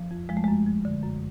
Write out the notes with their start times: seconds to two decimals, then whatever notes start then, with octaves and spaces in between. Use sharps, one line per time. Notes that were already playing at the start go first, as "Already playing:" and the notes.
Already playing: F3
0.11 F2
0.29 F3 G#3
0.37 A3
0.44 F#2 G#3
0.67 F3
0.85 D3
1.04 F#2